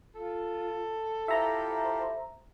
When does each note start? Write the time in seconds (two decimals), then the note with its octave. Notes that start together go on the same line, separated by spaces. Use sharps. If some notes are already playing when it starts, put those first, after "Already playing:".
0.15 F4 A4
1.28 E4 F4 G4 C5 E5 A#5